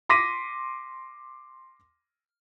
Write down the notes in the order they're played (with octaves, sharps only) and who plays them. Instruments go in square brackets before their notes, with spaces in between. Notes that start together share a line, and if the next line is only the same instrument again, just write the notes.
[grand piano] C6 D6 A#6 B6 D#7